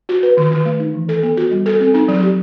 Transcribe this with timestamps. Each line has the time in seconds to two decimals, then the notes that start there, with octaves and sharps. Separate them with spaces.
0.09 F#4
0.23 B4
0.37 D#3
0.51 D#3
0.65 A3
0.80 D#4
0.94 E3
1.09 A4
1.23 B3
1.37 F#4
1.51 G3
1.66 A4
1.80 C4
1.94 D#4
2.08 F#3
2.23 G4